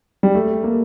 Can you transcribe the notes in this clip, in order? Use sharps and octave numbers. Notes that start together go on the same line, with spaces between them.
G3
A3
A#3